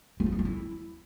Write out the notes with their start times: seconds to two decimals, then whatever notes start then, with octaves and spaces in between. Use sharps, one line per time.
0.20 A3
0.26 F4
0.33 D#4
0.39 D4
0.45 E4